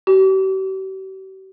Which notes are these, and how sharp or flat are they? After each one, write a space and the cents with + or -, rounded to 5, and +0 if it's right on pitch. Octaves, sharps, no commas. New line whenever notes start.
G4 -45